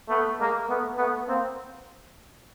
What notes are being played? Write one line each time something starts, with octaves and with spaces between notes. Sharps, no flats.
A3 B3
G#3 A#3
A3 B3
A3 B3
A#3 C4